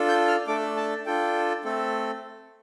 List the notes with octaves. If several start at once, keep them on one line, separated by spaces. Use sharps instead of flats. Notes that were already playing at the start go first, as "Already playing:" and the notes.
Already playing: D4 F4 A4
G6
F6
A3 D4 A4 D6
A5
D4 F4 A4 G5
A3 C4 A4